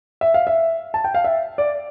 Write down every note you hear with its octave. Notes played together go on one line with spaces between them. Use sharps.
E5
F5
E5
A5
G5
F5
E5
D5